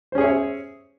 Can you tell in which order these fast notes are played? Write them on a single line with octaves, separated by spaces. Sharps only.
C5 C#4 G#4 C#5 E5